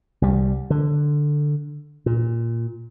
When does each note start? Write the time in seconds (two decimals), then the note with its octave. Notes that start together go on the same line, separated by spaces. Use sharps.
0.22 C2 G3
0.70 D3
2.06 A#2